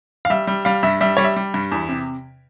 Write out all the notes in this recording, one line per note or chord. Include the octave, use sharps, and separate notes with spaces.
F5
G3 E5
G3
G3 F5
G2 E5
G3 E5
G3 C#5
E5
G3
G2
E2
C3